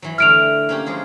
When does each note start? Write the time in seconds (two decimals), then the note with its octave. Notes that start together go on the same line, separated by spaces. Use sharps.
0.02 E3 F#3
0.18 D3 A3 E4 F6 D7 F7
0.69 A#3 C#4 G4
0.86 F3 G#3 G#4